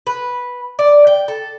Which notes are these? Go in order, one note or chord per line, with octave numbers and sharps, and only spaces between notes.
B4
D5
G5
A4